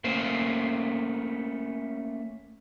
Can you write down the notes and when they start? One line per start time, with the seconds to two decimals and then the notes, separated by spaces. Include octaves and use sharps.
0.04 A3 A#3 C#4 C5